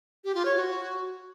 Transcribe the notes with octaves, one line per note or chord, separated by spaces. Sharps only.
G4
F4
C#5
F#4